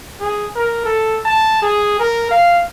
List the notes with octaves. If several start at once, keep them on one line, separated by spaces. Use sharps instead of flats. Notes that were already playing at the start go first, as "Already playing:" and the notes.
G#4
A#4
A4
A5
G#4
A#4
F5